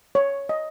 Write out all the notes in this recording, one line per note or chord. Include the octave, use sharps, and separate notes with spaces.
C#5
D#5